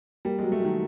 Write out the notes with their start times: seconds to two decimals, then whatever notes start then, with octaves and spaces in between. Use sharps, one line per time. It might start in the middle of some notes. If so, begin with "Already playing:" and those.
0.25 G3 A#3
0.39 F#3 G#3
0.52 A3
0.60 D#3 F#3